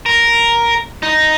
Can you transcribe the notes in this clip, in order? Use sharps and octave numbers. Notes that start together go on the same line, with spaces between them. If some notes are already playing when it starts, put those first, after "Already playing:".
A#4
D#4